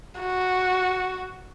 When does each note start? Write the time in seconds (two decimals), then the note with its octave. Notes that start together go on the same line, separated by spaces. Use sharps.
0.21 F#4